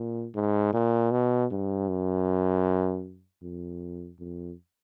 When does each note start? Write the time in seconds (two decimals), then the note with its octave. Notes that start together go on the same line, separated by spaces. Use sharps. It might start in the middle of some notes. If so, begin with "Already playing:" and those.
Already playing: A#2
0.35 G#2
0.73 A#2
1.11 B2
1.51 G2
1.89 F#2
3.43 F2
4.19 F2